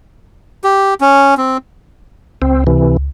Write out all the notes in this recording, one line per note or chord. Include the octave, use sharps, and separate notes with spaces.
G4
C#4
C4
C#2 C4
C3 E3